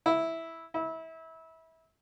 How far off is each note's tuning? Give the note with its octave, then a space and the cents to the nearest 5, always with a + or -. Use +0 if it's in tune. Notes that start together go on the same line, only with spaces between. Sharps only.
E4 -5
E4 -25